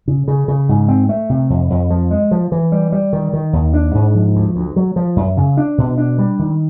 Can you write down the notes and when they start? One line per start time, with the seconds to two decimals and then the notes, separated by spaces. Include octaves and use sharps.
0.08 C#3
0.28 C#3
0.48 C#3
0.69 G#2
0.88 C4
1.09 A3
1.29 C3
1.50 F2
1.70 F2
1.90 F3
2.11 G#3
2.31 F3
2.52 E3
2.72 G3
2.92 G3
3.13 D#3
3.33 D#3
3.53 D#2
3.74 D4
3.95 G#2
4.15 F3
4.35 D2
4.55 D2
4.76 F#3
4.96 F3
5.16 F#2
5.37 C#3
5.57 D4
5.78 B2
5.98 D4
6.18 G3
6.39 D#3